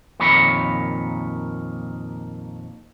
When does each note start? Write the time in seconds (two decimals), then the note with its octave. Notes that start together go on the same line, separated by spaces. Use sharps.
0.20 F2 A#2 D#3 C#5 B5